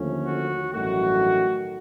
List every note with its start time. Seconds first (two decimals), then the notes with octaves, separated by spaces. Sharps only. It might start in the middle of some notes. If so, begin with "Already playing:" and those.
Already playing: D#2 D3 F3 A3 C#4
0.26 F#4
0.74 A1 G2 D#3 F#3 A3 F#4